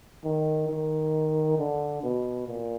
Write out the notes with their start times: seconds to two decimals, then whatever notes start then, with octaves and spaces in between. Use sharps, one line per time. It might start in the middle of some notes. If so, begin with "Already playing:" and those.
0.24 D#3
0.69 D#3
1.58 D3
2.03 B2
2.48 A#2